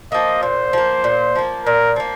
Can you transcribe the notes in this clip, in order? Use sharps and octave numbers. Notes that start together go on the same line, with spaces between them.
F3 A#3 D#5
A#2 C5
F3 A#3
A#2
F3 A#3
A#2 A#4
F3 A#3